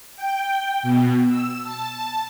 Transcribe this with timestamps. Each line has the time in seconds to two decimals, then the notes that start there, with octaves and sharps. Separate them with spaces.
0.16 G5
0.83 B2
1.28 E6
1.63 A5